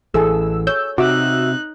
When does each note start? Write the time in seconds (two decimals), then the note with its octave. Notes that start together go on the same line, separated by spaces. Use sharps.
0.14 A1 E3 G#4 A4 E6
0.67 C#5 E6 G6
0.98 C3 D#4 F#4 E5 D6 E6 F#6